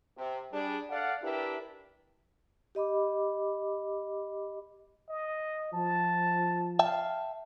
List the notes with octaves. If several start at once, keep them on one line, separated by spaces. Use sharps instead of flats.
C3
G3 D4 G#4
A4 D5 F5 F#5
D4 E4 G4 A#4 B4 E5
G4 D#5 B5 D6
D#5
F3 A5
E5 F5 G5 A5